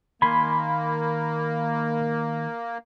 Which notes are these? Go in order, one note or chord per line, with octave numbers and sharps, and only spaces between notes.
D#3 A#3 G#5 B5 C6